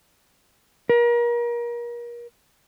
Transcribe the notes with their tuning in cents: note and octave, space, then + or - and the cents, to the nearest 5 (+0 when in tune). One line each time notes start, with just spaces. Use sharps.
A#4 +35